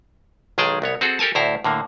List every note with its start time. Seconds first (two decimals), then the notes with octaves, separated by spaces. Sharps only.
0.58 B1 D#3 G#3 G#4 G5 A5
0.82 C2 B3 C#5
1.01 C4 F#4 G#4 A4
1.19 G4 A4 A#4 G#5 A5
1.35 D2 A2 E4 C5 A#5
1.64 A2 D3 A#3